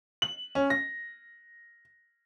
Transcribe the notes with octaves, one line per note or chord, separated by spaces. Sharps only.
F#7
C#4
A#6